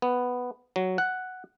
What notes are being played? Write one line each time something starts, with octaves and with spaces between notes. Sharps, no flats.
B3
F#3
F#5